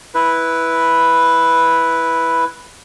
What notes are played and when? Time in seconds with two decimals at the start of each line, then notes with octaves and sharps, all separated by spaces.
0.14 E4 B4